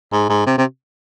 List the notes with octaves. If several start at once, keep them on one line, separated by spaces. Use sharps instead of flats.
G#2
G#2
C3
C3